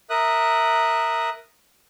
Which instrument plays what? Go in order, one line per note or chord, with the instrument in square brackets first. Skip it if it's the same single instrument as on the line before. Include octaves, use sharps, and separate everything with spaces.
[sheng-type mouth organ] A#4 E5 D#6 F#6